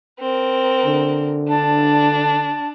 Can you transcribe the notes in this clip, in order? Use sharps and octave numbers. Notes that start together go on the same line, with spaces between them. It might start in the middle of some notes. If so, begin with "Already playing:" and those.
C4 A#4
D3
D4 A5